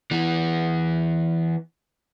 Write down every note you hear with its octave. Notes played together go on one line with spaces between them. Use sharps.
E3 B3